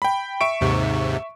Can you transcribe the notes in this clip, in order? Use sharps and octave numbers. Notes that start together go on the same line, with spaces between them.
G5 B5
E5 C#6 D7
D#2 G#2 C3